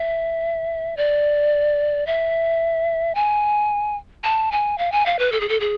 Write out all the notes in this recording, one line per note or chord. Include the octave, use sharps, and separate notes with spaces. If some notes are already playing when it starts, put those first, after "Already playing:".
Already playing: E5
D5
E5
G#5
A5
G#5
F5
G#5
F5
B4
A4
G#4
A4
G#4